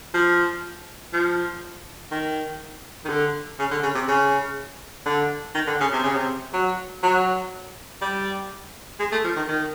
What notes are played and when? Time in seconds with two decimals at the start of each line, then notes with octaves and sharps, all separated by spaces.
0.14 F3
1.13 F3
2.12 D#3
3.05 D#3
3.09 D3
3.59 C#3
3.71 D3
3.83 C#3
3.95 C3
4.08 C#3
5.06 D3
5.55 D#3
5.67 D3
5.81 C#3
5.93 C3
6.03 C#3
6.16 C3
6.54 F#3
7.03 F#3
8.02 G3
9.00 G#3
9.12 A3
9.24 F3
9.36 D#3
9.49 D#3